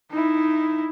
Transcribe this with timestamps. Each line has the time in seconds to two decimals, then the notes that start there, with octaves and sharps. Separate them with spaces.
0.11 D#4 E4